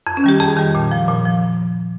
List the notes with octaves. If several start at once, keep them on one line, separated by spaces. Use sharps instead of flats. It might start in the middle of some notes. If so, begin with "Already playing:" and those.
F2
C#4
D#3 G3 G4
F2 G#4
D#3 G3
A#2
F3
A#2
F3